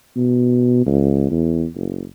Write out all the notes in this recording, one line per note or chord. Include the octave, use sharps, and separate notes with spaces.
B2
C#2
E2
F#1